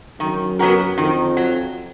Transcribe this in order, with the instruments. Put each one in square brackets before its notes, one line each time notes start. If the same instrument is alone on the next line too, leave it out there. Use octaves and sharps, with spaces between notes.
[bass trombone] F#2 [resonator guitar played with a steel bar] D#3
[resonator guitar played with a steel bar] F#3 B3 F#4 A#4
[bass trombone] F2 [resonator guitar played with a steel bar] D#3
[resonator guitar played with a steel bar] F#3